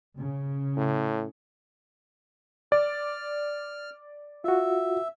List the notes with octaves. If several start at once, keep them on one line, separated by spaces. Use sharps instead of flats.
C#3
A2
D5 F6
F4 F#4 E5